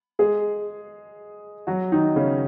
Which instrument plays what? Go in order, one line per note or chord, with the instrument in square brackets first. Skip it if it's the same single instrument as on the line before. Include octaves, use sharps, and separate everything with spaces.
[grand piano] G#3 G#4
F#3 F#4
D#3 D#4
C#3 C#4